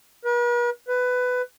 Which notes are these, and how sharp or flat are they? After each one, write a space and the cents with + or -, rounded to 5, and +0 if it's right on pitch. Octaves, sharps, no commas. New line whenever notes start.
B4 -45
B4 +15